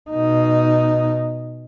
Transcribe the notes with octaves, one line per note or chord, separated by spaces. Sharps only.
B2 D#4